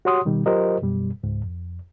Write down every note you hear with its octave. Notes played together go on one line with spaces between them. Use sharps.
F#4 G4 C#5 F#5 C6 D#6
B2 D#3 G3
F#3 F4 G4 A#4 C5 D#5
F#2 B2 G3
C#2 G#2
F2